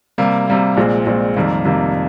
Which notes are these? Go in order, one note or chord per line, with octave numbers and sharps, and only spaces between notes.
C3 G3 A#3
C3 G3 A#3
A#1 A#2 G#3 C4
A#1 A#2 G#3 C4
F2 C3 D#3 G3 A#3
F2 C3 D#3 G3 A#3